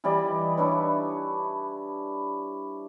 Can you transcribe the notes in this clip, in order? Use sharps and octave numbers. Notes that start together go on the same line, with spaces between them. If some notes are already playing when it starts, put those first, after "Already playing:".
E3 G3 D5 D#5
D4 E4 B4 C#5